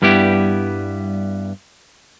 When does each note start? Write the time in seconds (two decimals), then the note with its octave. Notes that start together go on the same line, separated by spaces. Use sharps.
0.02 G2 G3 B3 E4 G4